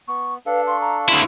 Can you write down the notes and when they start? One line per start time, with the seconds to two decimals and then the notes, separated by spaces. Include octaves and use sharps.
0.08 B3 C#6
0.46 D4 A4 B4 F5
0.67 F5 C6 C#6
0.81 A#5
1.08 D2 E4 C6